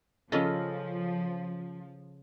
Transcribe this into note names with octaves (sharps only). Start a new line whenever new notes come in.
C#3 F3 C#4 F4 A4 D#5